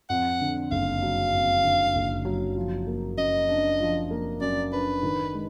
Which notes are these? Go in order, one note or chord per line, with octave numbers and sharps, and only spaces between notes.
F2 F#5
D3
F#1 F5
F#3
F2
D3
F#1
F#3
F3
A#3
F#2 D#5
D4
F3
A#3
F#2 D5
D4 B4
D#3
G#3